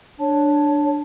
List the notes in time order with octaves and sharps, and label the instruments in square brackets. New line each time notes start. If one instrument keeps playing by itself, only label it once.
[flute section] D4 C#5 A5